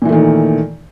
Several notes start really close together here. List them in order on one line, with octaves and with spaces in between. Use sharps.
A#2 E3 A3 D#3